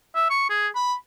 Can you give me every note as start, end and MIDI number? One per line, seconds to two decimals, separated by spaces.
0.15 0.29 76
0.30 0.46 85
0.50 0.68 68
0.75 0.95 83